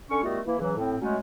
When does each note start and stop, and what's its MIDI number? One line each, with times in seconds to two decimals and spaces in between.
0.10 0.19 50
0.10 0.19 61
0.10 0.19 85
0.23 0.39 51
0.23 0.39 55
0.23 0.39 57
0.23 0.39 59
0.23 0.39 65
0.23 0.39 66
0.45 0.58 52
0.45 0.58 58
0.45 0.58 64
0.59 0.75 49
0.59 0.75 52
0.59 0.75 54
0.77 0.95 45
0.77 0.95 60
1.01 1.16 54
1.01 1.16 56
1.01 1.16 57
1.01 1.16 61